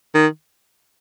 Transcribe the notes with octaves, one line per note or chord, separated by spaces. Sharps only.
D#3